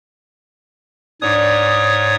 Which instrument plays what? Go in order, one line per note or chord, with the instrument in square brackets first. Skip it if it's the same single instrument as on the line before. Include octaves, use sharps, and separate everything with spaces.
[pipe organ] G#2 C#5 D#6 [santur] D4 D5